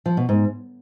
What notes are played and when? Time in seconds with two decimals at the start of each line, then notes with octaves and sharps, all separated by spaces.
0.06 F3
0.17 B2
0.29 G#2